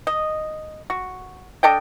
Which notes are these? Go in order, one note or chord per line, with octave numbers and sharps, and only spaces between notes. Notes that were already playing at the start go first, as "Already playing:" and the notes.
D#5
F#4
D4 A4 D#5 G5